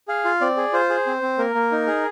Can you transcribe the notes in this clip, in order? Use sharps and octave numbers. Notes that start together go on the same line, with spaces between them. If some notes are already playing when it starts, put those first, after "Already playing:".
G#4 F5
F4
C4 D5
G#4
F4 C5
G#4
C4
C4
A#3 A#4
A#3
D#4
G#4